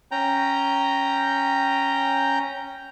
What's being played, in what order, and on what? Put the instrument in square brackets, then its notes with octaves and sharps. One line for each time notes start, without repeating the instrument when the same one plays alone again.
[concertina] C#4 G5 A#5